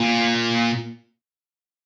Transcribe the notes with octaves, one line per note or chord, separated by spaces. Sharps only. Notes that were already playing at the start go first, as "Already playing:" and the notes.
Already playing: A#2